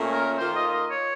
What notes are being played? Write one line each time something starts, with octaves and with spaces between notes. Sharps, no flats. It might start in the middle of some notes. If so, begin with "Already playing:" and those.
Already playing: A#2 A3 C#4
A#4
D#3 A#3 F4 C5
D#5
D#5
C#5